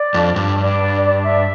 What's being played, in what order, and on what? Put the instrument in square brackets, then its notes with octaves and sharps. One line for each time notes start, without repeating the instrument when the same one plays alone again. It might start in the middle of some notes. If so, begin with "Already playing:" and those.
Already playing: [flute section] D5
[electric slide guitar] F2 [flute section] D4
[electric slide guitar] G2 [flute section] D4
[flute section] D4
D5
D4
E5